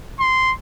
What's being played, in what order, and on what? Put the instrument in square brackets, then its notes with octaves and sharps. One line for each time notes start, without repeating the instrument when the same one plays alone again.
[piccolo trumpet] C6